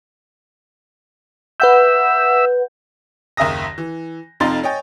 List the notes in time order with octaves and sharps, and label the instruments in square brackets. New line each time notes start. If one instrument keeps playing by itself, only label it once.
[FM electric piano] B4 F#5 G6 [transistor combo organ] E5
[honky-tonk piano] F#1 D#2 E5 A#5 D#6 A#6
E3
F1 F2 D#4 F4 C6 A6
C#5 D#5 G5 G#5